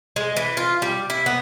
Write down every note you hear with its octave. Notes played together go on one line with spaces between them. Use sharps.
G#3
E3
F4
G3
E4
B3